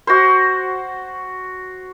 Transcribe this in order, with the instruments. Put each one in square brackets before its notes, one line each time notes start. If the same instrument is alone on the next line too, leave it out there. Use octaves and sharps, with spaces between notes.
[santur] F#4 C5